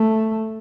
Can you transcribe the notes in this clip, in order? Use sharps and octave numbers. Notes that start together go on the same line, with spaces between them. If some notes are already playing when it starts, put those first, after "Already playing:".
Already playing: A3